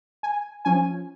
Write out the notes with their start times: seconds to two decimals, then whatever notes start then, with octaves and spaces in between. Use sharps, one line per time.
0.23 G#5
0.65 F3 C#4 G#5